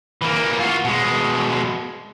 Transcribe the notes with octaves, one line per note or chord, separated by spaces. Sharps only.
E3 A#3
F4 F#4
B2 G#3